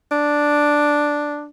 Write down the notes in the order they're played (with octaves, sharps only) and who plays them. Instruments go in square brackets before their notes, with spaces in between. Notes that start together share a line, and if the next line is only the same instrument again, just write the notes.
[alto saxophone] D4